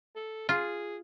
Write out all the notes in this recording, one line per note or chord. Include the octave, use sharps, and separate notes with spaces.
A4
F4 G#4